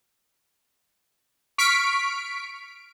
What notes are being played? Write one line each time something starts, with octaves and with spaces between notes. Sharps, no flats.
C#6 F6 B6 D7